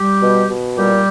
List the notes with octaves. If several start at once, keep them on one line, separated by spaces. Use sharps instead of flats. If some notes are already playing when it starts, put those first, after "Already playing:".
Already playing: G3 G4
B2
B2
A#2 G3 G4